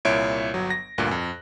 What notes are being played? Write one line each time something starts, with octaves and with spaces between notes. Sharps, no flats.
C2 A#2 E4 C#5 E5 D7
G1 F#3
A#6
D2 G2 A#2 F#6
F2